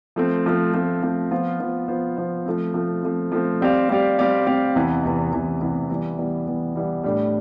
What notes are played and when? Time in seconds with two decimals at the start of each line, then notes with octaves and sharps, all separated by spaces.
0.16 F3 A3 C4
0.46 F3 A3 C4
0.74 F3 A3 C4
1.03 F3 A3 C4
1.31 F3 B3 F4 C5
1.60 F3 B3 F4 C5
1.88 F3 B3 F4 C5
2.17 F3 B3 F4 C5
2.46 F3 A3 C4
2.74 F3 A3 C4
3.03 F3 A3 C4
3.32 F3 A3 C4
3.61 G3 C4 G4 D5 F5
3.89 G3 C4 G4 D5 F5
4.18 G3 C4 G4 D5 F5
4.46 G3 C4 G4 D5 F5
4.75 E2 C3 E3 B3
5.03 E2 C3 E3 B3
5.32 E2 C3 E3 B3
5.61 E2 C3 E3 B3
5.90 E3 G3 B3
6.19 E3 G3 B3
6.47 E3 G3 B3
6.75 E3 G3 B3
7.04 A2 G3 D4